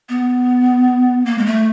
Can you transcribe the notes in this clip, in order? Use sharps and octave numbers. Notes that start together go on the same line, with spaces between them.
B3
A#3
G#3
A3